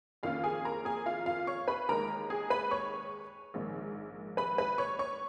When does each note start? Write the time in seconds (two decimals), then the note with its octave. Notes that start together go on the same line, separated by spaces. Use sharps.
0.23 F2 D#3 A#3 C#4 F4 F5
0.43 G#4 G#5
0.65 A#4 A#5
0.85 G#4 G#5
1.06 F4 F5
1.26 F4 F5
1.47 C#5 C#6
1.68 B4 B5
1.89 D#2 D#3 G#3 A#4 A#5
2.30 G#4 G#5
2.50 B4 B5
2.71 C#5 C#6
3.54 A#1 G#2 D#3
4.37 B4 B5
4.58 B4 B5
4.78 C#5 C#6
4.99 C#5 C#6